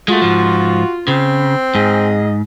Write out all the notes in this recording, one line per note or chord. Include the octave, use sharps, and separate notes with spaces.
G#3 A3 F4 F#4
G#2 F3
C#3 C4
G#2 G#4 D#5